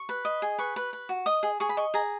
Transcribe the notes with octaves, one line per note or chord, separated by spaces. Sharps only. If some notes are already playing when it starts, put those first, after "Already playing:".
Already playing: C#6
B4
D#5
G#4
B4 C#6
B4
B4
F#4
D#5 D#6
G#4
G#4 C#6
B5
D#5 C#6
G#4 A#5